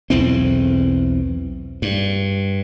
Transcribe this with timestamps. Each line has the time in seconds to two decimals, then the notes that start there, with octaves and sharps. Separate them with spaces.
0.10 B1 E2 E3 C4
1.82 G2